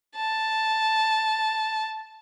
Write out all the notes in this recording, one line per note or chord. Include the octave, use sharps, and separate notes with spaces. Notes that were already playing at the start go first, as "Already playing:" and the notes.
A5